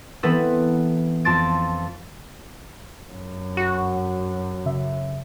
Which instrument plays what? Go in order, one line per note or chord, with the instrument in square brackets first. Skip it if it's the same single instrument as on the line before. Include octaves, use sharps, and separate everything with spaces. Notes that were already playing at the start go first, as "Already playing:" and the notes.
[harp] E3 B3 C4 A4 B4
F2 A5 C6 A6 D7
[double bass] F#2
[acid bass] F#4
[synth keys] C#3 E5